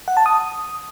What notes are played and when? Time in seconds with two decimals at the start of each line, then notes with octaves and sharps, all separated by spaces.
0.08 F#5
0.17 A5
0.26 D#6